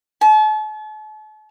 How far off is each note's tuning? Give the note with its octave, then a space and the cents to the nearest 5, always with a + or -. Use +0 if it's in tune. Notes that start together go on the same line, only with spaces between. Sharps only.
A5 -40